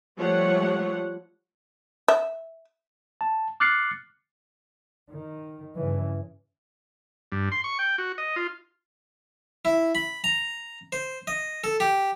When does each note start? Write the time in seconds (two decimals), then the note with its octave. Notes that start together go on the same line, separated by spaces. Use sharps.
0.18 F3 G3 A3 F4 C#5 F#5
2.08 E5
3.21 A5
3.60 D6 F6 F#6 A6 C7 C#7
5.12 D#3
5.78 G2 C#3 E3
7.32 G2
7.52 C6
7.64 C#6
7.79 G5
7.98 F#4
8.18 D#5
8.36 F4
9.65 E4
9.95 B5
10.24 A#5
10.92 C5
11.27 D#5
11.64 A4
11.80 G4